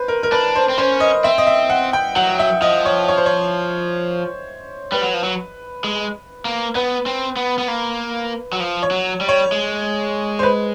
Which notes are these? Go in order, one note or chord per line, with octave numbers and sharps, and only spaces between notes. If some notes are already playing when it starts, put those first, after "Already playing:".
Already playing: B4 C5
A#4
A#4
D4 B4
C5
C4
C#4 C5
D#5
C4 E5
D#5
E5
F#5
G5
F#3 F#5
E5
F3 D#5
C#5
C#5
C5
C#5
G3 B4
F#3
F3
F#3
G#3
A#3
B3 B4
C4
B3
B3
A#3
F#3
F3
C#5
F#3
G3
C#5
G#3
C5
B4